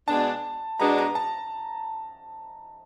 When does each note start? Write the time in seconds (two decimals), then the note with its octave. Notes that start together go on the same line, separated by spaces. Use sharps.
0.08 B2 G#3 B3 D4 A5
0.80 B2 G#3 B3 D4 A#5
0.98 A#5
1.15 A5